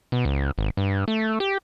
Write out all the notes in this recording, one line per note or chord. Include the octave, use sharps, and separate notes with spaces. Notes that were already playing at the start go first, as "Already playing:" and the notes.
B2
C#2
G#1
G2
A3
G4